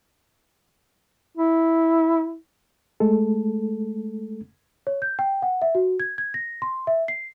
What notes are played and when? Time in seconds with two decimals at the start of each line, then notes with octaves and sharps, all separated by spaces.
1.37 E4
3.00 G#3 A3 A4
4.87 C#5
5.02 G6
5.19 G5
5.42 F#5
5.62 E5
5.75 F#4
6.00 G#6
6.18 G#6
6.34 A#6
6.62 C6
6.87 E5
7.08 C7